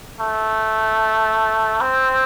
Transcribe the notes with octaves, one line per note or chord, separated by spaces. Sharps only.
A3
C4